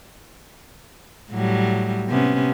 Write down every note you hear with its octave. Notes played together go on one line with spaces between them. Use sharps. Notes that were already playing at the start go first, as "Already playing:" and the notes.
A2 F#3 G3
C3 B3 C#4